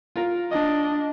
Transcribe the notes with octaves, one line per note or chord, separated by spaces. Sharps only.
F4 A#4
D4 D#5